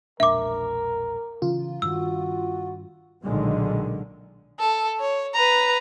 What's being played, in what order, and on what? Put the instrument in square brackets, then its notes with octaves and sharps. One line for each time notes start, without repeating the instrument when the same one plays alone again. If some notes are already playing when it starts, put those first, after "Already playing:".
[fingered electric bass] E1 A#1 D4 [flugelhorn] A#4 [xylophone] E5 D6
[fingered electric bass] C#3 E3 [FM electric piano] F4
[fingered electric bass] G2 D#3 [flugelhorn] F#4 [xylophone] E6
[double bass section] B1 A#2 D3 D#3 F#3 G#3
[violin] A4
C#5
B4 A#5